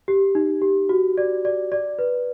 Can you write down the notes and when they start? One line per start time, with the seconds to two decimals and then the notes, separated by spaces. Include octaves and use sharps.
0.08 G4
0.35 D#4
0.62 G4
0.89 F#4
1.18 D5
1.45 D5
1.72 D5
1.99 B4